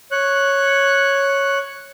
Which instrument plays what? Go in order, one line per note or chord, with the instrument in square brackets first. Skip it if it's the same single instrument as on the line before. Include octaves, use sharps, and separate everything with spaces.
[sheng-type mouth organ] C#5 F#6